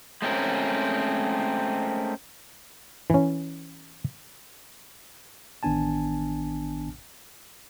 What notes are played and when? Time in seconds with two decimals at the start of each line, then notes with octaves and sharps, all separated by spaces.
0.22 G#3 A3 C4 C#4 A#4
3.10 E3 C#4
5.63 A1 D#3 B3 D4 G#5 A5